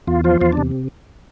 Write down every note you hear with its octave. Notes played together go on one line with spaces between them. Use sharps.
E2 F4
F3 F4
E2 F4
C3 D4